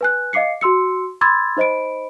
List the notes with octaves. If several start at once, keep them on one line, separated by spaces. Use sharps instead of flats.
B4 G#5 F#6
D#5 F5 D6 C7 C#7
F#4 C6 E6 C#7
B5 C6 D6 E6 G#6 A6
D#4 C5 D#5 B5 D7